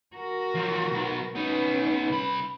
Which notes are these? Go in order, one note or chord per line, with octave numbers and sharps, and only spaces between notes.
F#4 A#4
F3 F#3
B1 B3
B3 C#4 D#4 B4
C2 B5